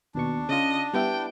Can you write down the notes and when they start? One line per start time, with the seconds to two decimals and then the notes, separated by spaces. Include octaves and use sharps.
0.15 D#2 B2 D4 C#6
0.49 C#3 F4 D#5
0.93 G3 B3 E4 G5